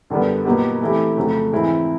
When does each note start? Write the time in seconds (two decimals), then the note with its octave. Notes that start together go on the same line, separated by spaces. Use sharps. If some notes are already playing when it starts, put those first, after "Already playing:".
0.10 F#2 D3 G3 B3
0.45 A#2 F#3 B3 D#4 G4
0.81 E3 A3 C4 E4 G4
1.17 F2 C#3 F#3 A3 C4
1.52 G#2 E3 G#3 C4 E4